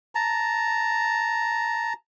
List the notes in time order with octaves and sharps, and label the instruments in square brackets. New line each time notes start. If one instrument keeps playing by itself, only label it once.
[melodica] A5 A#5